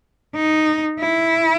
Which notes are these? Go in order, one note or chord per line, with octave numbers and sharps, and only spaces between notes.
D#4
E4